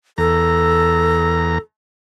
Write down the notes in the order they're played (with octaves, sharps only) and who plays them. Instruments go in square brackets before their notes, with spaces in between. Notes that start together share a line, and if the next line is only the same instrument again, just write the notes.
[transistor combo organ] E2 A#5 [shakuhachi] A4